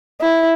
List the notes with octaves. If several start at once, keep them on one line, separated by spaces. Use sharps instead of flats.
E4